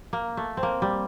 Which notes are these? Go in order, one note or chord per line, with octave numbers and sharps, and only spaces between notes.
A#3
A3
C4
A#3
G3